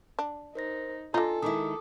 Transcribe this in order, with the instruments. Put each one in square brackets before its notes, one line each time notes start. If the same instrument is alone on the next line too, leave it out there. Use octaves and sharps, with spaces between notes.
[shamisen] D4
[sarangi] D#4 [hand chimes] A#4 C5 A#6
[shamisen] D3 D#4 [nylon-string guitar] F4 [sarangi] A4 [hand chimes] G#5
[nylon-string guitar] D#3 G#3 E4 [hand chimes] D6 D#6